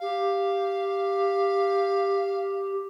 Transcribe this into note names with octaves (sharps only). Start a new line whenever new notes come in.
G4 F5